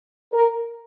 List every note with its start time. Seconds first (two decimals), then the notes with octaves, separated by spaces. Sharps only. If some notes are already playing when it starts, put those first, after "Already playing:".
0.32 A#4